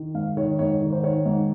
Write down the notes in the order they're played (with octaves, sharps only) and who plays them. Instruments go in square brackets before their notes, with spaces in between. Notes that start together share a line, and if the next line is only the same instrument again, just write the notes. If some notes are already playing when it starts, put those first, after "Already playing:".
Already playing: [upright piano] D#3
G#2 F5
D#3 C#5
G#2 C#5
D#3
C5
D#3 C#5
G#2